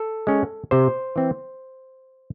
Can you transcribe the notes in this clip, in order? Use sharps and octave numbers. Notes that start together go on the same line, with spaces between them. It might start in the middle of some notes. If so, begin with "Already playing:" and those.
Already playing: A4
G#3 C#4
C3 C5
E3 C4